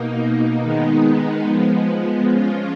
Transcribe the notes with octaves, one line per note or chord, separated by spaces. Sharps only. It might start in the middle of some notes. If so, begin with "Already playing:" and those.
Already playing: B2 A#3 D#4
D#3 G#3 B3 D#4
F3 G#3 B3
F3 G#3 C#4 F4